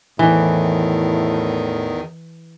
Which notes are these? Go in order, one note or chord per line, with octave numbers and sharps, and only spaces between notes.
E2 A2 D#3 E3